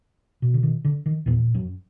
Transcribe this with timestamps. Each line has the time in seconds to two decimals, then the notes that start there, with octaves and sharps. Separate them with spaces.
0.42 B2
0.54 D3
0.63 D#3
0.85 D3
1.06 D#3
1.26 E2 A#2 E3
1.55 F#2 F#3